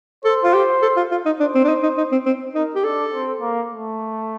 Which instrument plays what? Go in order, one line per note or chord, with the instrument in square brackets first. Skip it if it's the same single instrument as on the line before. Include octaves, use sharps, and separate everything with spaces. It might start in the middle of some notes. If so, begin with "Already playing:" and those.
[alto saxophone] A4 [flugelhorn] C5
[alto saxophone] F4
G4
A4
F4
F4
D#4
[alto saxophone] D4 [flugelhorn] C5
[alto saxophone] C4
D4
D#4
D#4
D#4
C4
C4
[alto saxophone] D#4 [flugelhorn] A#4
[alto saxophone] G4
[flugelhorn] D4 [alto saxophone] A4
[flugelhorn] C4
A#3
A3